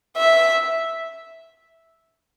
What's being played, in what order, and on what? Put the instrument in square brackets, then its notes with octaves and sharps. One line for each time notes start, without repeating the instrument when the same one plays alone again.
[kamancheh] E5